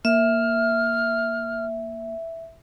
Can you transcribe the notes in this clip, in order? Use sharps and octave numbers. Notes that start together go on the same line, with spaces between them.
A#3 E5 F6